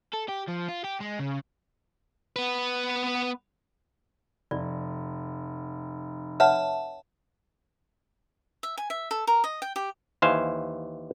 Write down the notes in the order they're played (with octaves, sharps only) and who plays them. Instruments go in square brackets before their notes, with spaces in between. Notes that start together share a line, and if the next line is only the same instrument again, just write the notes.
[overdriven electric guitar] A4
G4
F3
F4
G4
G#3
C#3
[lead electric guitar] B3 B4
[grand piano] F1 [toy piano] D5
[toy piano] B4 C#5 F#5 [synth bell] E5 A5
[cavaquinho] E5
G#5
E5
A4
A#4
D#5
G5
G4
[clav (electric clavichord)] D#2 E3 C5 F5 G#5